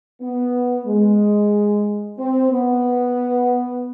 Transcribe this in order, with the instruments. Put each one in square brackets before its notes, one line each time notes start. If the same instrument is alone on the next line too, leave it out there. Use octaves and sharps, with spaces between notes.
[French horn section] B3
G#3
C4
B3